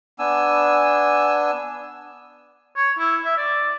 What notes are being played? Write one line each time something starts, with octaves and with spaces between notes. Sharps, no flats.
B3 D4 G#5 E6
C#5
E4
E5
D5